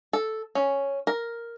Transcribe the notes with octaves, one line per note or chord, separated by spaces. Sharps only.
A4
C#4
A#4